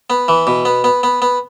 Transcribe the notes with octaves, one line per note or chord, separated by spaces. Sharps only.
B3
E3
B2
B3
B3
B3
B3